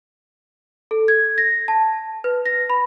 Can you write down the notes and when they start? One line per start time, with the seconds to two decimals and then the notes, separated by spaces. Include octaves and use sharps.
0.91 A4
1.08 G#6
1.38 A#6
1.68 A5
2.24 B4
2.46 A#6
2.70 B5